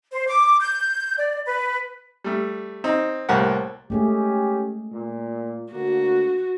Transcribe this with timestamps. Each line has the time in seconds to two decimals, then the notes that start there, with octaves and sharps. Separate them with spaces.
0.11 C5
0.27 D6
0.60 G6
1.18 D5
1.46 B4
2.24 G3 A3
2.84 C4 D#4
3.29 C2 A2 G3 A#3 F#5
3.90 G#3 A3 C#4 G4 G#4
4.93 A#2
5.72 D2 D3 A#3 F#4